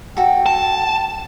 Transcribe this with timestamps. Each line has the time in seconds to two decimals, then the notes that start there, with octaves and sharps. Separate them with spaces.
0.17 F#4 A4 G5
0.46 A5